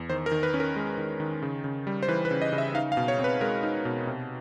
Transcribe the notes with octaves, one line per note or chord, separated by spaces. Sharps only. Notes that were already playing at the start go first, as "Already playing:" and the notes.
Already playing: E2
D#3 C5
A#4
D#3
B4
C#4
A#4
G#3
D#3
D#3
C#3
C#3
G3
C5
E3 B4
B4
C#3
D#5
C#3
E5
D#4 F5
F5
B2
C#5
C4
B4
G#3 A#4
D#4
B2
C3